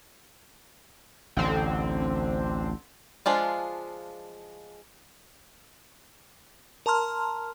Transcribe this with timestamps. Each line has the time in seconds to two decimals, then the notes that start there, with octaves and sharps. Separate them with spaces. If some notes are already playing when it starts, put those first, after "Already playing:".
1.37 A1 D2 D3 C4
3.26 F3 G#3 D4 F4
6.86 A#4 A5 A#5 C6 F6